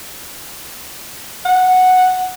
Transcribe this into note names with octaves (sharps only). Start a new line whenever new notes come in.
F#5